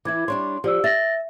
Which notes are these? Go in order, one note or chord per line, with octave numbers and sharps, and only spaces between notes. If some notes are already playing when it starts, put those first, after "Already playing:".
E3 E4 D6 G#6
G3 D4 C#5 C6
F3 G4 D5 E6
E5 A6 A#6